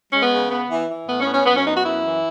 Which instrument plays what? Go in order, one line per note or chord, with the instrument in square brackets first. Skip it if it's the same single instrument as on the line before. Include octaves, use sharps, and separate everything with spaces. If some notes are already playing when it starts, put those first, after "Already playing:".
[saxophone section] G#3 C#4
B3
C#3
B3
E3
E3
A2 B3
C#4
B3
C#4
F#2 B3
C#4
B3 D#4
F#4
F#2 E4
E3